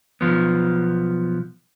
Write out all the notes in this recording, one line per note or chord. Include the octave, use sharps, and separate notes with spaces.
B1 E2 F3 B3